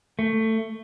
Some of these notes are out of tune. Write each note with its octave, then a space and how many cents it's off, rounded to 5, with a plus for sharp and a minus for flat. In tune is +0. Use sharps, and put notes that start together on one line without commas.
A3 +15